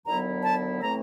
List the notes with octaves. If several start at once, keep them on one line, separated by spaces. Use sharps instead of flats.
D#2 D3 F#3 B3 E4 A#5
A5
A2 E3 A3 C4 A#5